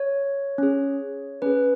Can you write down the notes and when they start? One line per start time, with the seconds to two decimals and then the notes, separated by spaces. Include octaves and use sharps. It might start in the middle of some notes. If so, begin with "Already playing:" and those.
Already playing: C#5
0.58 C#4 G#4
1.42 C#4 G#4 B4